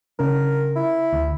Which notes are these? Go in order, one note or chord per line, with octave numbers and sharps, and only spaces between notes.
C#3 C#4 D4 A#4
E4
D2